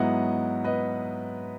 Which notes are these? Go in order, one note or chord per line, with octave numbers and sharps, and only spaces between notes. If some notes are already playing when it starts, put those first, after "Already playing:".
Already playing: G#2 F#3 B3 E4 D#5 F#5
B4 D#5